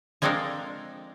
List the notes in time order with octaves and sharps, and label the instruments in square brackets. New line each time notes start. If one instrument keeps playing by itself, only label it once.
[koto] F3 G#3 C4 D4 A4 A#4